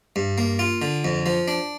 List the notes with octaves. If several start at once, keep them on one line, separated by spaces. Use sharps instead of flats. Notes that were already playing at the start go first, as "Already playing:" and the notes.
G2
A#3
F4
D3
F2
F3
D4